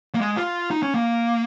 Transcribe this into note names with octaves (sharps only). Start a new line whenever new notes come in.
A#3
G#3
F4
D#4
C#4
A#3